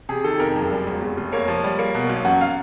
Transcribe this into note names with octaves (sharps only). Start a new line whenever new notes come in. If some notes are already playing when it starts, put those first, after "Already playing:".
C3 G#4
D#3 A4
F2 A#4
F#1
G3
E1
F1
F1
A#3 C#5
F3
G3
A#3
B2
B1
F#2 F#5
F5